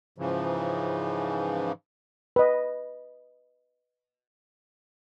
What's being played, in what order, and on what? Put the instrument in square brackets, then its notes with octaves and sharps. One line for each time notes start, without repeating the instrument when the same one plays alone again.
[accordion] G#2 C#3 E3 F3
[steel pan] B4 D#5